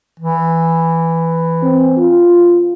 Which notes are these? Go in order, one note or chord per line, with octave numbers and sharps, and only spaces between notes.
E3
C4
F4